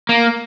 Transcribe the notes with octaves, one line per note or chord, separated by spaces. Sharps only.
A#3